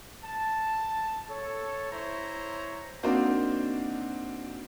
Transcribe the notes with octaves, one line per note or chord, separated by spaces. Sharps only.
A5
A4 C#5
E4 C5 C#5 E5 A#5
A#3 C4 D4 D#4 F#4 C5